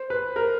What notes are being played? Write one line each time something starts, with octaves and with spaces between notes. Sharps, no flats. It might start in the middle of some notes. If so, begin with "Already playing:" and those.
Already playing: C5
B4
A#4